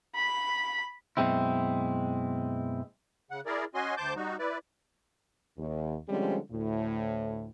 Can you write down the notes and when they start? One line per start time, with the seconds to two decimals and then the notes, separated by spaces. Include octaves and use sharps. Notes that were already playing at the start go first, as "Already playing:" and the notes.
0.15 B5
1.17 F#2 B2 G#3 C4 E4
3.31 C#3 F#5
3.46 E4 G#4 A#4 D5
3.75 C#4 F#4 D#5 G#5 C6
3.97 D2 C5 A5 D6 G6
4.16 G3 D#4 F#4
4.39 E4 B4 D5
5.58 D#2
6.08 D3 F3 G3 G#3 C4 C#4
6.51 D2 A2